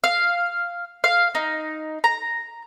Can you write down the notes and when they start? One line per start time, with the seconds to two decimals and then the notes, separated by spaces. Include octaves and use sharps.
0.04 F5
1.04 F5
1.35 D#4
2.04 A#5